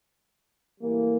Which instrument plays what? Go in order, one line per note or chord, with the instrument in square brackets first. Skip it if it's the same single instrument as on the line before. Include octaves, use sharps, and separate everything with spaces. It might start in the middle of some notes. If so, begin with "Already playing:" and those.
[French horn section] A2 E3 G3 A#3